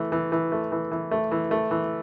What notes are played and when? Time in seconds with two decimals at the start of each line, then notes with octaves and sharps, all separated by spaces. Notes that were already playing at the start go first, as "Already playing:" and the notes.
Already playing: E3 A3
0.12 E3
0.32 E3
0.52 A3
0.72 E3
0.91 E3
1.11 A3
1.31 E3
1.51 A3
1.71 E3